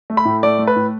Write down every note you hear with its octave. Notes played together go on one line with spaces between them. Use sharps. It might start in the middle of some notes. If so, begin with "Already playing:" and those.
A3
B5
A2
A3 D5
A3
B4
A2